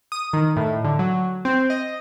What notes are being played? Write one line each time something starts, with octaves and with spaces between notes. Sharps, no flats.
D#6
D#3
A2
D3
F#3
C4
D#5